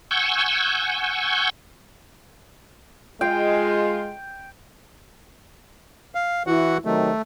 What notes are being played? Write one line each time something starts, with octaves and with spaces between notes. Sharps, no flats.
F#5 G#5 C#6 E6 G6
G#3 F4 G5
F5
E3 E4 F#4 F#5
C3 D#3 F#3 A3